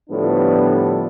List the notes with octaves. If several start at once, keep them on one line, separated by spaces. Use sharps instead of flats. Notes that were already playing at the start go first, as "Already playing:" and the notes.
A2 D3 F3 G3 B3 D4